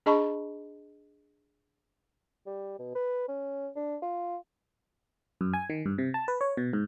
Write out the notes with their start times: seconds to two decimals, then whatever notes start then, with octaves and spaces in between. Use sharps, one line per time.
0.06 D4 G#4 D#5 A5 B5 C#6
2.47 G3
2.79 B2
2.95 B4
3.28 C#4
3.76 D4
4.02 F4
5.41 F#2
5.54 G#5
5.70 D#3
5.86 G2
5.98 C3
6.14 A5
6.28 B4
6.41 C#5
6.57 B2
6.73 G#2